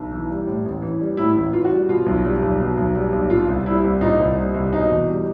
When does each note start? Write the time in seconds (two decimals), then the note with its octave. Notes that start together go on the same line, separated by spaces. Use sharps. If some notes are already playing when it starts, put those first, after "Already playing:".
Already playing: B1
0.12 E3
0.30 G3
0.47 A2
0.65 A1
0.82 E3
1.00 G3
1.17 A2 E4
1.35 A1
1.53 E3 F4
1.65 F#4
1.71 G3
1.89 B2 F4
2.06 B1
2.24 G3
2.42 B1
2.60 B2
2.77 B1
2.95 G3
3.12 B1
3.30 A#2 F4
3.48 C2
3.66 G3 E4
3.83 C2
4.01 A#2 D#4
4.19 C2
4.37 G3
4.54 C2
4.72 B2 D#4
4.90 E2
5.08 G3